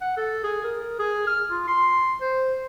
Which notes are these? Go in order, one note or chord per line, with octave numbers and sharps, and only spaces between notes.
F#5
A4
G#4
A#4
G#4
F6
F4
C6
C5